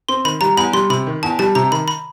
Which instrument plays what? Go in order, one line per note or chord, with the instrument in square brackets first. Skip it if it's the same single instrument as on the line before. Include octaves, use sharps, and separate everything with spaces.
[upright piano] C4 [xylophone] C6
[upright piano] D#3 [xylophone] B5
[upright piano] G3 [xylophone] A#5
[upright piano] E2 [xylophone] B5
[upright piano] G3 [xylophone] C6
[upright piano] C3 [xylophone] B5
[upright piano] D#3
[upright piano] E2 [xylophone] A5
[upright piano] G3 [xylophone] A5
[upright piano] C3 [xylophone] A#5
[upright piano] D#3 [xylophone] B5
[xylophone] B5